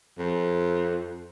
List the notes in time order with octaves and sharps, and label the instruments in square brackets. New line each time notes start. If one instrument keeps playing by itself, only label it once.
[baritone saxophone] F2